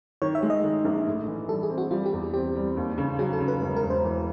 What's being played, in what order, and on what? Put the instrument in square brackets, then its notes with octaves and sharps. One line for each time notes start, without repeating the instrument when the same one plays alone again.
[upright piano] D#3 [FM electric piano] C#5
[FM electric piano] E5
[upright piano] G#3
[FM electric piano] D#5
[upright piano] D#3
A#1
A2
E3
[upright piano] G3 [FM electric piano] A4
[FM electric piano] G#4
[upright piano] C4
[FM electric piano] F#4
[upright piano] G3 [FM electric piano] F4
[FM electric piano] G4
[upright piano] E2
[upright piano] C4 [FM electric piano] G4
[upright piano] G3
D#2
C#3
[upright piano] F#3 [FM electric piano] G#4
[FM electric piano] A4
[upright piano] C#3
[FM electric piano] B4
[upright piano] E1
[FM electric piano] A#4
[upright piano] E1
[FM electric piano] C5
[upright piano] E3